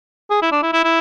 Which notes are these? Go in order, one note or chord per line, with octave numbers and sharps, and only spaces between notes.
G#4
E4
D4
E4
E4
E4